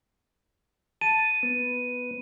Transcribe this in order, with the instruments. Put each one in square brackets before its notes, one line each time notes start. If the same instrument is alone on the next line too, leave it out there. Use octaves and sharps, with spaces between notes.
[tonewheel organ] A5 [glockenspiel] D#7
[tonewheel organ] B3